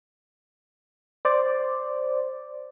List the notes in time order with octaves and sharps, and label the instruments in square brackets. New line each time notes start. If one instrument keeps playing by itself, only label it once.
[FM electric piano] C5 D5